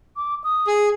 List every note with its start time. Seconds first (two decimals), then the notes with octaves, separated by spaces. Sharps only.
0.16 D6
0.44 D#6
0.67 G#4